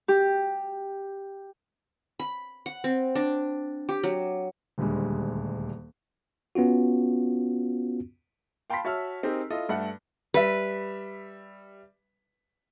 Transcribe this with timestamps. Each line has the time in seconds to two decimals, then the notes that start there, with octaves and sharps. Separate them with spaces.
0.08 G4
2.20 B5
2.66 F#5
2.84 C4
3.15 D4
3.89 G4
4.04 F#3
4.78 D#1 D2 G3 G#3
6.55 B3 C#4 F4 F#4
8.70 F5 G5 A5 B5 C6 B6
8.85 F#4 C#5 E5 A5 E6 F6
9.23 C4 D#4 G4 G#4 A#4
9.50 E4 F4 A4 D#5
9.69 G2 A3 E5 F#5 A5
10.34 G3 B4 E5